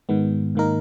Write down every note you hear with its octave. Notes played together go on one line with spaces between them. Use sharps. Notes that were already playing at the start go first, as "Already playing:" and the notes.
G#2 D#3 G#3 B3
G#2 D#3 A#3 D#4 A#4